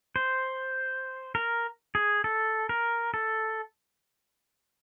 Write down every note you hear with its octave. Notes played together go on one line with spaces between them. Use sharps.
C5
A#4
G#4
A4
A#4
A4